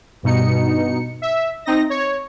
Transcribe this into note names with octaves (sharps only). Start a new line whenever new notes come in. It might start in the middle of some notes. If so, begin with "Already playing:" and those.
G2 B2 D#4 C#7
E5
C4 D#4 D#5 A#6
C#5